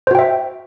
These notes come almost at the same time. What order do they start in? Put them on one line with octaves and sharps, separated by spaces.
C5 F#4 G5 E5